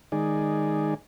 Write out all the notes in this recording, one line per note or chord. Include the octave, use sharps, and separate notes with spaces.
D#3 G#3 D#4 G#4 D5